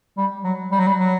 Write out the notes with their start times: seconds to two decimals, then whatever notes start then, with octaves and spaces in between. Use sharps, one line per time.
0.18 G3
0.44 F#3
0.72 G3
0.79 F#3
0.87 G3
0.99 F#3